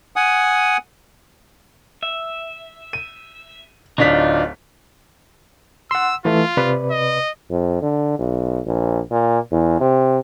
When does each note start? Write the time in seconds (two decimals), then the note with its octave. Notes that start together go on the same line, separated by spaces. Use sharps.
0.16 F#5 G#5 D#6
2.03 E5
2.93 D#7
3.98 D1 D4 D#4 F4 B6
5.91 F#5 C6 E6
6.25 E3 A3 F4
6.57 C3 B4 D5
6.91 D#5
7.51 F2
7.82 D3
8.19 B1
8.66 A#1
9.11 A#2
9.52 E2
9.81 C3